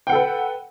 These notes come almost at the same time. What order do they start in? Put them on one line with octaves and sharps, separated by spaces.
G5 F#5 A4 B4